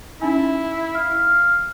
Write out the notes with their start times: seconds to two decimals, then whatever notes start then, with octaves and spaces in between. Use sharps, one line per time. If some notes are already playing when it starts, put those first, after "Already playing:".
0.21 C#4 D#4 E4 G#5
0.95 F5